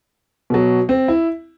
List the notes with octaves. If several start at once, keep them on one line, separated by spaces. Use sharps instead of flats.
B2 F#3
C4
E4